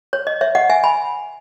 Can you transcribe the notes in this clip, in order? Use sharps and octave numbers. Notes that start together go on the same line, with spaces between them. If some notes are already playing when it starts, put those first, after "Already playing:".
C#5
D#5
C#5 E5
D#5 F#5
E5 G#5
G#5 B5